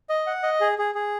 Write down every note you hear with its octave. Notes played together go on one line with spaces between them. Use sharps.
D#5
F#5
D#5
G#4
G#4
G#4